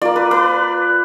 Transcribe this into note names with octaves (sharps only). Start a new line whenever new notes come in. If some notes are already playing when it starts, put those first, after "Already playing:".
A#3 F4 D5
B4
B4